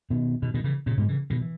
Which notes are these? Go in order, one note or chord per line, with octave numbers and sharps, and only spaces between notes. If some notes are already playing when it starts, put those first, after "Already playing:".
B2 D#3
B2 D#3
B2 D#3
C#3 E3
A#2 C#3
G#2 B2
C#3 E3
B2 D#3
E3